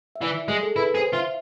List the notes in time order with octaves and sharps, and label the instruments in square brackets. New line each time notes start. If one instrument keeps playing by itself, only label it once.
[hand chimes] E5
[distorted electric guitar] E3 [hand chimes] D5
[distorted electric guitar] G#3 [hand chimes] G#4
[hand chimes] A4
[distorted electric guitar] E4 [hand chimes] B4
[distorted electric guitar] G#4 [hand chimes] C5
[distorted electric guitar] F4 [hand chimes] E5